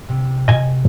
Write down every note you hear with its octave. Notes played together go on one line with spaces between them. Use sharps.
C3
D#5 G#5